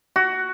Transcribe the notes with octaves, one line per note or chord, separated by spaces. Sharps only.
F#4